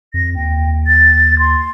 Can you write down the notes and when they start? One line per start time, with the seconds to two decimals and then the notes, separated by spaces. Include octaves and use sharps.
0.14 F2 A#6
0.36 D#2 G5
0.87 A6
1.39 C6